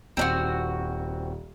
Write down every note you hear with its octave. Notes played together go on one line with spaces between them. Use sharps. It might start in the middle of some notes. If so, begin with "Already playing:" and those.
D#1 C4 D4 F#4